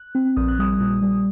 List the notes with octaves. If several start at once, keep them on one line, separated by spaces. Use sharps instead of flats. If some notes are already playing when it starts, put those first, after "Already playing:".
Already playing: F#6
C4
A#1 D#6
F#6
G3 D#6
A#2
G3